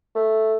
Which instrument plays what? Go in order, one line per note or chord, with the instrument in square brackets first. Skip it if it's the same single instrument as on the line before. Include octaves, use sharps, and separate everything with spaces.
[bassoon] A3